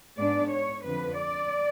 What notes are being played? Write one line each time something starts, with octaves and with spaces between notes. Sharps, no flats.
G#2 G#3 B3 D4 D5
C#5
F2 D3 F3 B4
D5